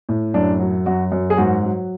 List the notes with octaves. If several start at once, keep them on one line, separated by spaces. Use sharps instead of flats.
A2
F#2 D4
F#3
F#2 F#4
F#2
G#4
G#2 F#4
F#3